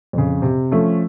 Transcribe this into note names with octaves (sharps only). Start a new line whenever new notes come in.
F2 C#3
C3
F3 A3 C#4